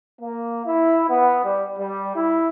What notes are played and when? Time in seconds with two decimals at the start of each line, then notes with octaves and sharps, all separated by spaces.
0.22 A#3
0.67 E4
1.10 B3
1.45 G3
1.79 G3
2.16 E4